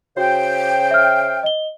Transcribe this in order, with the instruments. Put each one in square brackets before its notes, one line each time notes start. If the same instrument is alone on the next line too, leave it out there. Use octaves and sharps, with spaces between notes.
[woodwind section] C#3 C5 G5 [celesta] F#4
[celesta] E5 F6
D#5 G7